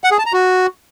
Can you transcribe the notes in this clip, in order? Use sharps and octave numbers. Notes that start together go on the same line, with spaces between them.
F#5
G#4
A5
A#5
F#4